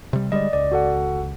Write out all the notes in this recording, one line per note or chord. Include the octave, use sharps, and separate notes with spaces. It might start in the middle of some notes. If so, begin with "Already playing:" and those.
C3 G3
D3 G3 G#3 D5 D#5
C#2 D5
F#4 A4 F#5